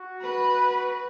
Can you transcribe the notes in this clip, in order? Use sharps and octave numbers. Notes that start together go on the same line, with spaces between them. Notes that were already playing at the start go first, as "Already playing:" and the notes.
Already playing: F#4
B4